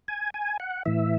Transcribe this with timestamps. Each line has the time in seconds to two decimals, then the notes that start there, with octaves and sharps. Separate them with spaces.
0.08 G#5
0.34 G#5
0.60 F#5
0.86 A2 E3 E5